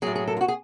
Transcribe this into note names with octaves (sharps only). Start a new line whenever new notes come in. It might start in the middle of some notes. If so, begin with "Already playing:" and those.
A2 F#3 G#4
G#4
A4
F4
F#4
G#4